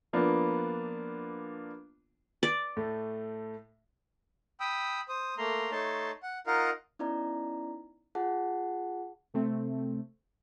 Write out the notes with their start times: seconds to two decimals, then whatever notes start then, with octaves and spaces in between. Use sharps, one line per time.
0.13 F3 A#3 B3 D4 F4
2.43 D5
2.77 A2 A3
4.60 G5 B5 D#6 E6
5.09 C5 D#6
5.38 A3 A#3 A#5 C6
5.71 A3 D#4 C#5 A5 C6
6.23 F#5
6.47 D#4 F4 A#4 D#5 F5 F#5
6.99 B3 C#4 D#4 E4 D5 A#5
8.15 F4 G#4 F#5 A5
9.34 C3 A3 C4